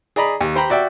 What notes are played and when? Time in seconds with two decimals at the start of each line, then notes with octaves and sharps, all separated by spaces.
0.16 G#4 D5 D#5 A#5 B5
0.41 D#2
0.55 G4 C5 G5 A#5 B5
0.70 F#4 D5 E5 G5